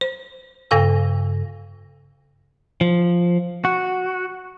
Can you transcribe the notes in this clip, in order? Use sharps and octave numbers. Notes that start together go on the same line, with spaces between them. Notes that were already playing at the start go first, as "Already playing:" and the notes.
C5
G2 C#3 A4 F5 G#5 E6
F3
F#4